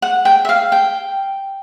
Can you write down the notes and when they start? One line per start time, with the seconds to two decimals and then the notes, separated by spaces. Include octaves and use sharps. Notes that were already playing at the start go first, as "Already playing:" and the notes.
0.02 F#5
0.25 G5
0.45 E5
0.49 F5
0.72 G5